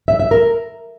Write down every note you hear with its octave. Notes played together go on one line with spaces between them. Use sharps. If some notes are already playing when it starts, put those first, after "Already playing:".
E5
E5
A#4